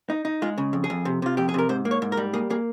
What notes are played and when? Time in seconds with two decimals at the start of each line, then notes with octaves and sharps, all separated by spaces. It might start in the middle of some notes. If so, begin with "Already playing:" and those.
0.10 D#4
0.25 D#4
0.42 G#3 F4
0.58 C#3
0.73 F2
0.84 G#4
0.90 F2
1.05 C3
1.22 C3 F4
1.37 F2 G4
1.49 G#4
1.54 C3 A#4
1.69 G#2 C5
1.85 A#3
1.91 C#5
2.02 G#2
2.12 A#4
2.17 G3
2.33 A#3 G#4
2.50 A#3 G#4